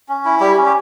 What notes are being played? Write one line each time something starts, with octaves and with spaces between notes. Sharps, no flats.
C#4
E4
G3 G4
C#4
G4